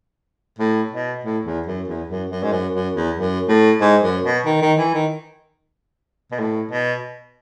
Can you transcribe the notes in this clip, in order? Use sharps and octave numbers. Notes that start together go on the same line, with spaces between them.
A2
B2
A2
E2
F#2
E2
F#2
F#2
G#2
F#2
F#2
E2
F#2
A2
G#2
F#2
B2
D#3
D#3
E3
D#3
B2
A2
B2